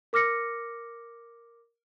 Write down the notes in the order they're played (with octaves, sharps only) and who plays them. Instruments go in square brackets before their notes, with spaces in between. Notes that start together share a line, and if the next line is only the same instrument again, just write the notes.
[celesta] A#4 D6 F6 A#6 C#7